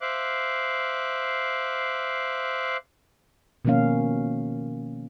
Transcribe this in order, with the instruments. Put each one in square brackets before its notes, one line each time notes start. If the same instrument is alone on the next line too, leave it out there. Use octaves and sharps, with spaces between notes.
[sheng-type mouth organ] C5 E5 F5 D6 F#6
[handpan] B2 D#3 F3 A#3 C#4 F5